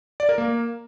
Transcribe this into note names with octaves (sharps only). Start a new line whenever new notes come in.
D5
A#4
A#3